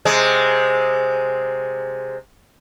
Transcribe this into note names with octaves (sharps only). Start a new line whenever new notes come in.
C3 G#3